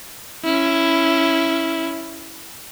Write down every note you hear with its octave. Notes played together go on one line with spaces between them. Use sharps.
C#4 E4